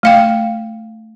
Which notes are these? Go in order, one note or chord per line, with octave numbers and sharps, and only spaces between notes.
A3 F5 G5